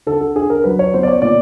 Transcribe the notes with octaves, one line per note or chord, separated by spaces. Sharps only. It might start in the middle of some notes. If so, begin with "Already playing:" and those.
D3 A4
A4
D4 G#4
A#4
F#3 B4
C#5
B3 C5
D5
C#5
A#2 D5